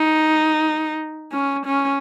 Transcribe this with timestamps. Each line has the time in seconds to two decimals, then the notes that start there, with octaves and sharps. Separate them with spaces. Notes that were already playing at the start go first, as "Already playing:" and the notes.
Already playing: D#4
1.32 C#4
1.66 C#4